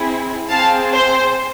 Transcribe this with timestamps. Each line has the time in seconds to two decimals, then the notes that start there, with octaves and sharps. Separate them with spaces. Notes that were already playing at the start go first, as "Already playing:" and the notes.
Already playing: C4 E4 G#4
0.49 C4 G#4 F5 A5
0.93 C5